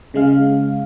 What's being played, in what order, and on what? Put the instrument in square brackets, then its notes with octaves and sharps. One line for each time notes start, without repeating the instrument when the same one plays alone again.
[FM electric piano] C#3 G#3 F5